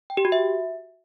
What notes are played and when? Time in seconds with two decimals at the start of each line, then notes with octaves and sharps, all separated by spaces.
0.10 G5
0.17 G4
0.25 F#4
0.32 E5